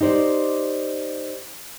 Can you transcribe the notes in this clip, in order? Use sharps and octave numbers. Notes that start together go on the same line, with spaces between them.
D#4 G4 C5 D5